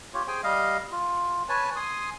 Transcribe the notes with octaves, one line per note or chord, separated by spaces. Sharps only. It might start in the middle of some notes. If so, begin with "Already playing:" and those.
F4 G4 C#5
G#4 C5 G5 G#5
G3 D#5 F5
F4
B4 C#5 G#5 A5
G#5 C6 D#6